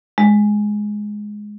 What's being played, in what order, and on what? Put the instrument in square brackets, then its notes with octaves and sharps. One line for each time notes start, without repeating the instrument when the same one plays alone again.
[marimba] G#3